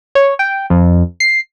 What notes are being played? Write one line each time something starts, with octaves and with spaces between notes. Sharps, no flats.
C#5
G5
F2
C7